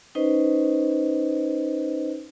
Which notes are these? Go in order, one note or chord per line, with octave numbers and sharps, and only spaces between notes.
C#4 D#4 B4 C5 D#5